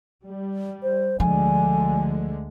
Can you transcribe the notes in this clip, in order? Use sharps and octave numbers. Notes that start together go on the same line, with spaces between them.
G3
C5
D2 D3 F3 G#3 G#5